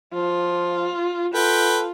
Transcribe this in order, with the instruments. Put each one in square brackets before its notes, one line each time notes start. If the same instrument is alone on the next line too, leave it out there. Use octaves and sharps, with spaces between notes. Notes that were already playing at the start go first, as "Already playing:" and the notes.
[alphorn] F3 [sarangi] F4
[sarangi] F4 [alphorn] A4 [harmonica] B4 G5